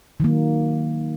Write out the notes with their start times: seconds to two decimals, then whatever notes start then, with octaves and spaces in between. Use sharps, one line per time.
0.20 D#3 F#3 A#3